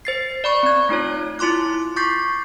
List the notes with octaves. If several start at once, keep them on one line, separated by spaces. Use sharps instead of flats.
C5 A6 C7
D5 B5 C#6
C4 G#6
A3 D#4 F4 C#5
E4 F4 C6 D6 F#6
C#6 D6 G6 A6 B6 C7